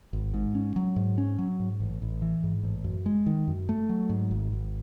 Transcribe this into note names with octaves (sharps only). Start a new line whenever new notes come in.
G#1
G#2
C#4
F#3
G#2
C#4
F#3
G#2
A1
A1
E3
G#2
A1
F#2
G#3
D#3
F#2
A3
F#3
G#2
G#1
G#1